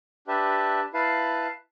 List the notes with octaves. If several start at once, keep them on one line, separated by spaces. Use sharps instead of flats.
D4 G4 B4 E5 A5
E4 B4 F5 A5